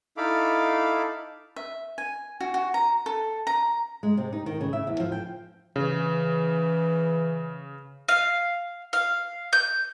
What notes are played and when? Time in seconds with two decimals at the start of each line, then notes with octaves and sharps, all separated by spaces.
0.17 D#4 E4 A4 F5 B5 D6
1.56 E5
1.98 G#5
2.40 F#4
2.54 F#4
2.74 A#5
3.06 A4
3.47 A#5
4.03 G#3
4.17 C3
4.33 D#4
4.46 D#3
4.61 C#3
4.73 E5
4.87 E2
5.00 F3
5.12 G5
5.76 C#3 E3
8.09 F5
8.93 F5
9.53 G6